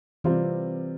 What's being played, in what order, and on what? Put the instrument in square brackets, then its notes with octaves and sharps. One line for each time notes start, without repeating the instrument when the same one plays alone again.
[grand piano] C3 G3 C4 F4 [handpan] E3